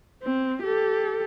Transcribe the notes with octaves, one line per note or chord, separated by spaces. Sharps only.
C4
G4 A4